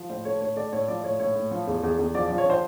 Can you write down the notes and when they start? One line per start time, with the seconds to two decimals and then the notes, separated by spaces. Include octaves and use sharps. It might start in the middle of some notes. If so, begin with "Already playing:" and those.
Already playing: F3
0.09 A2 C5
0.25 A3 C#5
0.41 A2 C#5
0.56 A3 D5
0.73 A2 C#5
0.88 F3 D5
1.04 A2 C#5
1.20 A2 C#5
1.35 A2
1.51 F3
1.67 E2
1.83 E2
1.99 E2
2.14 F3 D5
2.26 D5
2.30 F3
2.38 C#5
2.46 F3 C5